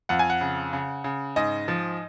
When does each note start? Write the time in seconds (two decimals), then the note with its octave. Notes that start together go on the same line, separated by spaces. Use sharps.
0.09 F2 F#5
0.19 G#5
0.30 F#5
0.41 C#3
0.73 C#3
1.04 C#3
1.36 G#2 D#5
1.68 F3